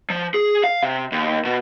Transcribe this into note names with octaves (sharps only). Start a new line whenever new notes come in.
F3
G#4
F5
C3
D#2
B2